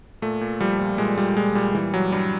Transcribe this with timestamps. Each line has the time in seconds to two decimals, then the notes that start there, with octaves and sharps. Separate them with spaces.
0.22 A#2 A3
0.41 A#2
0.61 F3 G3
0.80 A#2
0.98 A#2 G#3
1.17 A#2 G3
1.36 A#2 G#3
1.55 A#2 G3
1.75 E3 G3
1.93 E3 F#3
2.12 G2 G3